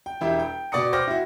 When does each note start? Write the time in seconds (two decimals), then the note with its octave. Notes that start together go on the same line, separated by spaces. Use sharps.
0.06 G5
0.21 E1 E4 G4
0.39 G5
0.72 B2 D5 C#6 D#6 C#7
0.93 C5 G5 D6 F6 A#6
1.07 E4 F#4